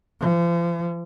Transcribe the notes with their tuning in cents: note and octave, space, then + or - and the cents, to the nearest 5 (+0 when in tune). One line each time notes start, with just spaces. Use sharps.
F3 -35